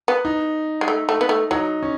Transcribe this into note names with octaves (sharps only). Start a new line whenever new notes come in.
B3
D#4
G#3
A3
A3
B3
A3
F#3 D#4
C#4